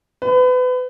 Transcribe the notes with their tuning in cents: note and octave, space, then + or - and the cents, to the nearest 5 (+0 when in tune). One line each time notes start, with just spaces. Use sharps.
B4 +30